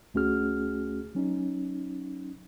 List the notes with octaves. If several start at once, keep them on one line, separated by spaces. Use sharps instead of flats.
D2 A3 C#4 F#4 G#4 F6
F#3 C#4 D#4